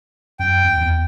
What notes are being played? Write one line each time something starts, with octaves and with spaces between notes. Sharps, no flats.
F#2 G5
F2
E2